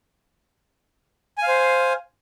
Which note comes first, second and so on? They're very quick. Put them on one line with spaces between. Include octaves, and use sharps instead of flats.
G#5 F5 C5